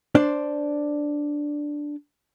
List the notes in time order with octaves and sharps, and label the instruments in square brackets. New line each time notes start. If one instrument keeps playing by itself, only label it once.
[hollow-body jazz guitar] D4 C5 D5